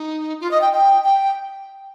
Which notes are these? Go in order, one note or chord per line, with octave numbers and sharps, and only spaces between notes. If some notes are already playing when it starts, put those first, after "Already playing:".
Already playing: D#4
F4
D#5
G5
G5
G5